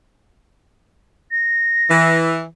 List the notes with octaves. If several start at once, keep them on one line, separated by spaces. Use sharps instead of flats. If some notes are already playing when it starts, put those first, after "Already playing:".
A#6
E3